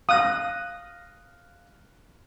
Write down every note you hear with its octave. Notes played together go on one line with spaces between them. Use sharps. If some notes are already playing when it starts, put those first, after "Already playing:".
F5 D#6 F#6 A#6